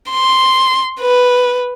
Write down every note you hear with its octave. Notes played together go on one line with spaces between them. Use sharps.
C6
B4